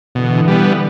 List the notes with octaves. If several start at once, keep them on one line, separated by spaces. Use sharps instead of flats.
B2 D3 E3
G3 B3